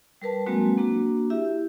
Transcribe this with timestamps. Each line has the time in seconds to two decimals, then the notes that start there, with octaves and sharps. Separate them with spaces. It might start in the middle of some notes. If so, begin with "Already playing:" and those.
0.22 G3 A#4 B4 A5
0.46 F#3 G#3 A#3 C4 F#4
0.77 A#3 D4 F#4
1.30 E4 G4 E5